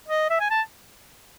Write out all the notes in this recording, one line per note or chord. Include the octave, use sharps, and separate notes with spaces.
D#5
E5
G#5
A5